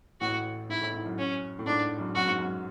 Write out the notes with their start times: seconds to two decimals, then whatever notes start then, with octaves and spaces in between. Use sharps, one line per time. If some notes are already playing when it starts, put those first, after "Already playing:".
0.20 A1 A2 F#4
0.69 G#2 E4
0.81 A1 A2
0.94 G#2
1.06 F#2
1.18 C#4
1.59 A2
1.66 G#2 D4
1.99 F#2
2.15 F#2 F#4
2.26 G#2
2.39 F#2